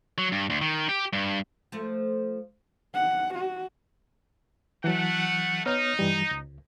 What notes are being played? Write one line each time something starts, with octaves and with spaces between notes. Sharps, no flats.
F#3
G2
D2
D#3
G4
G2
F3 A3
F#5
F#4
E3 F#3 A3 F#5
B3 D#4 C#5 F6
G2 E3 G3
C#2